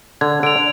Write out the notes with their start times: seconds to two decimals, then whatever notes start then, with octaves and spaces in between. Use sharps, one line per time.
0.21 D3 G#6
0.43 D3 D7 F7